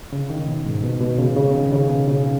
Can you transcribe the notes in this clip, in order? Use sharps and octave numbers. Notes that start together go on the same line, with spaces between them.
C#3
D#3
B2
G#2
B2
B2
C#3
C#3
D#3
C#3
B2
C#3